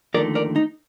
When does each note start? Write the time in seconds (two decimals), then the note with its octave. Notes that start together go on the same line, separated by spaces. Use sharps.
0.14 D#2 D3 F3 A3 D#4 A#4 D5
0.35 A#4 D5
0.56 D#4